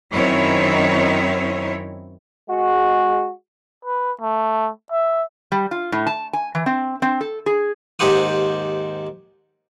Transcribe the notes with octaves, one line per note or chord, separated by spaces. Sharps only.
F#2 D#3 C4 D#4 E4 C#5
G#3 F#4
B4
A3
E5
G3
F4
A2
A5
G#5
E3
C4
C4
A4
G#4
D#2 G#2 G4 C5 F#5 D#6